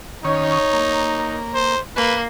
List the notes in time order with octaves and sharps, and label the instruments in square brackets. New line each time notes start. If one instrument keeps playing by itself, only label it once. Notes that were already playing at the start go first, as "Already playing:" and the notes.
[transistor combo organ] D#3 C#4 [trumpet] D#4 [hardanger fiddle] C#5
[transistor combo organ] A#3
[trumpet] C5
[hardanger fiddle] A#3 [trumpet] B4